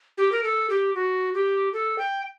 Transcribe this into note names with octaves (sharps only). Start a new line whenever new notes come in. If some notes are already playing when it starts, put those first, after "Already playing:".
G4
A#4
A4
G4
F#4
G4
A4
G5